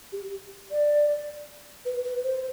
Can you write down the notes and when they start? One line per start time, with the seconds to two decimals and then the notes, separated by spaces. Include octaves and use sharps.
0.12 G4
0.71 D5
1.85 B4
2.05 B4
2.24 C5